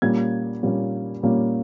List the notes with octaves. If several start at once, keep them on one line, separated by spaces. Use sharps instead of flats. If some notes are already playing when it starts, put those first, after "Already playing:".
A#2 G3 A#3 C#4 G#6
A#2 G3 A#3 C#4
A#2 G3 A#3 C#4